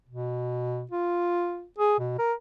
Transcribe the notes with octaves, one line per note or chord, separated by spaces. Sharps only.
B2
F4
G#4
B2
A#4